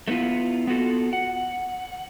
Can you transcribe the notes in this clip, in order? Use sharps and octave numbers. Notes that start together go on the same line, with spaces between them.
A3 B3 C#4 E4 F4
B3 F4 F#4 A4
F#5